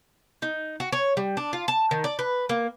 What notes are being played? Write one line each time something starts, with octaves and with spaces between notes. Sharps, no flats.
D#4
F#4
C#5
G3
D4
F4
A5
D#3
D5
B4
A#3